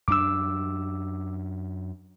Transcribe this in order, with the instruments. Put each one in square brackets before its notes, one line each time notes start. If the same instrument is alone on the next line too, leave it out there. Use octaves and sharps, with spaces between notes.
[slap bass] F#2 D4 [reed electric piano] D6 E6